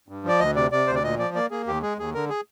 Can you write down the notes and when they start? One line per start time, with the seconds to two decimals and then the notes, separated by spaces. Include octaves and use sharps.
0.09 G2
0.24 F3 D5
0.40 D2 D#5
0.55 C3 D5
0.72 C3 D5
0.87 D2 C5
0.95 D5
1.04 A#2 D#5
1.19 F3 D5
1.35 A#3 D5
1.51 A#3 G#4
1.67 D#2 G4
1.82 G#3 G#4
1.98 D#2 G#4
2.14 D3 A#4
2.30 G#4